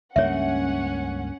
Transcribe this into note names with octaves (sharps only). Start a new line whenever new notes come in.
C#2 G2 A#3 C#4 C#5 E5 F#5